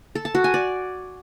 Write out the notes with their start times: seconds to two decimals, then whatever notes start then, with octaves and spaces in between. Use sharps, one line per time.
0.15 A4
0.25 A5
0.35 F#4
0.44 G#5
0.54 D5